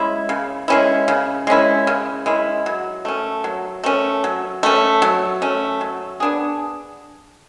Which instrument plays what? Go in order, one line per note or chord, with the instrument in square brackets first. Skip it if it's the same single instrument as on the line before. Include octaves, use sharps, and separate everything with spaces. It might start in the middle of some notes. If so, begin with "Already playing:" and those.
Already playing: [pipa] G#3 C#4 E4
C#3
G#3 C#4 E4
C#3
G#3 C#4 E4
C#3
G#3 C#4 E4
F#3
A3 C#4
F#3
A3 C#4
F#3
A3 C#4
F#3
A3 C#4
F#3
B3 D4 G#4